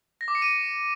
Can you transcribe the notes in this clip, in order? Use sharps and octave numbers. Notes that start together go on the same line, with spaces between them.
A#6
D6
C#7
D#7